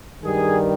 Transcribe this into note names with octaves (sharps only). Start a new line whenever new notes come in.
G2 D#3 G3 G#4